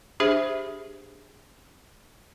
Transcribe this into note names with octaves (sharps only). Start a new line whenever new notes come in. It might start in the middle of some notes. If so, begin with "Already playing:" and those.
D4 G4 G#4 C5 E5